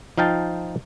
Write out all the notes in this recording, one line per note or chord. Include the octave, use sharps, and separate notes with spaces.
F3 D#4 F5 G5 A5